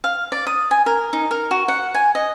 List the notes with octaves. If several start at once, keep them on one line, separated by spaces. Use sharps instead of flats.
F5
D5
D#6
G#5
A#4
D#4
A#4
F#4
F#5
G#5
D#5